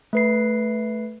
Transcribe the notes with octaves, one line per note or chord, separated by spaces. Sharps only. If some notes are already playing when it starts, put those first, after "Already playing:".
A3 B4 C7